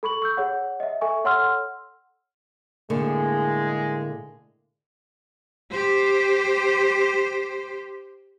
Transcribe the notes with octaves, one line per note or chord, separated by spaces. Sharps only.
A4 B5 C#6 F#7
C#6 E6 G6
G#4 C#5 F#5
D#5 E5
A4 E5 G#5 C#6
A4 C#5 F#5 C6 E6 F6
A2 D3 G#3 A#3
G4 C5